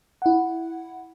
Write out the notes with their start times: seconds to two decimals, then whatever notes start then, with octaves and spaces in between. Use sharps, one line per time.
0.22 E4 F#5